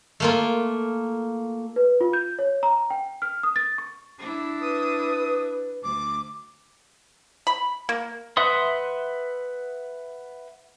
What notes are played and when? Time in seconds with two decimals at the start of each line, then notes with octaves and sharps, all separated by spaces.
0.20 A3 A#3 F4
1.76 B4
2.01 F4
2.13 G6
2.39 C#5
2.63 A#5
2.90 G5
3.22 F6
3.43 D#6
3.56 A6
3.78 C#6
4.18 D4 E4
4.61 B4 D#6
5.83 D2 D6
7.47 B5
7.89 A#3
8.37 B4 E5 F#5 C6 D#6